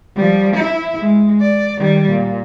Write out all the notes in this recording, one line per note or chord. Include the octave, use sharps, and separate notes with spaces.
F3 G3
E4
G#3
D5
D#3 G3
A#2